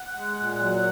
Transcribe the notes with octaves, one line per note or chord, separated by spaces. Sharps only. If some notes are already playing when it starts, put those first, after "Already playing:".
Already playing: F#5
G#3
A#2
F#3